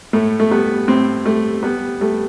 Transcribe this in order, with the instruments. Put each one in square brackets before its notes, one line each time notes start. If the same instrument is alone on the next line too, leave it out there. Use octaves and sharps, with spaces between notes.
[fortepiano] A2 A3
A3
G3 B3
A2 C4
G3 A3
G3 B3
G3 A3